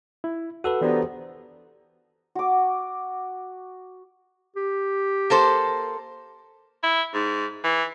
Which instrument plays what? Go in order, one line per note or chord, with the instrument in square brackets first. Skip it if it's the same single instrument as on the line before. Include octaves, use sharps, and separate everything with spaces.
[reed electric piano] E4
[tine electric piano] F#4 A4 B4 [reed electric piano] F#5 E6
[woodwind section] D3 B3 D#4 [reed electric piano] E3 G4 C5
[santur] F#4 D6
[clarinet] G4
[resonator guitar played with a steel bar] A#3 A4 C5
[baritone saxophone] E4
G#2
E3